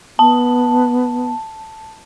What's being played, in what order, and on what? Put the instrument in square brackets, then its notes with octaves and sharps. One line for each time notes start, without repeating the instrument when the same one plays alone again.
[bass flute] B3 [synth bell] A5